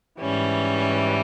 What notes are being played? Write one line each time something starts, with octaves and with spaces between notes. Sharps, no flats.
G#2 E3 G3 C#4